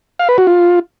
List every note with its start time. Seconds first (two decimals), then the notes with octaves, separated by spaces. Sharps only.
0.19 F5
0.29 B4
0.38 F#4
0.47 F4